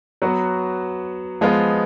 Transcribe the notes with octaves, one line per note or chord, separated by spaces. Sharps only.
F#3 B3 F#4
F3 G#3 B3 F4